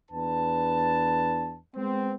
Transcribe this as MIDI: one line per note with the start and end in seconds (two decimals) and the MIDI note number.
0.11 1.56 40
0.11 1.56 62
0.11 1.56 71
0.11 1.56 81
1.75 2.15 56
1.75 2.15 59
1.75 2.15 60